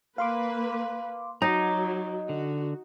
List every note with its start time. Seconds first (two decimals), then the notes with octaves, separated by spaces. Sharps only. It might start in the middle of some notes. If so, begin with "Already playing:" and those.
0.18 A#3 B4 F5 C6 D6
1.42 F#3 D#4 D#5 A#5 D6
2.29 D3 F#4